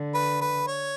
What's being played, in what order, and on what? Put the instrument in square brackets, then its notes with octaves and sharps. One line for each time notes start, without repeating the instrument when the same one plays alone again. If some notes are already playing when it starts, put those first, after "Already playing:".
Already playing: [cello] D3
[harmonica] B4
B4
C#5